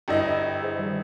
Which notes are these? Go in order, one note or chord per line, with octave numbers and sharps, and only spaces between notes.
G1 E4 D#5 G5
G#4 C5
D#3 G3